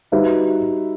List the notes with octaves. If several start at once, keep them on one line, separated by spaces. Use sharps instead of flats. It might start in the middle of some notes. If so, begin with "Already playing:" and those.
G3 D#4 F#4 B4 E5